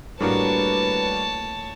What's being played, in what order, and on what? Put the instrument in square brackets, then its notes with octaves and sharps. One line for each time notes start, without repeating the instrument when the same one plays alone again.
[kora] A2 A#3 [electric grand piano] G3 D4 F#4 [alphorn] B4 [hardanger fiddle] C#5 A5